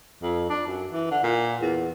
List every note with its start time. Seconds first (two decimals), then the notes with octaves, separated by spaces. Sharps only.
0.22 F2
0.50 D4
0.67 F#2
0.91 E3
1.11 D3
1.23 A#2
1.62 E2